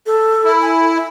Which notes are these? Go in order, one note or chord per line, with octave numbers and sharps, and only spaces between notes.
A4
E4
G#5
E5